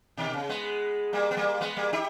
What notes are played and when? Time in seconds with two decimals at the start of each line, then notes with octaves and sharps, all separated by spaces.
0.17 B2 D#3
0.33 C#3
0.49 G#3 B3
1.13 G3 A#3
1.31 B3
1.37 G3 A#3
1.61 G#3 B3
1.77 G3 A#3
1.93 D#4 G4